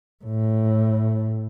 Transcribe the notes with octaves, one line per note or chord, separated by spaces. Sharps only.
A2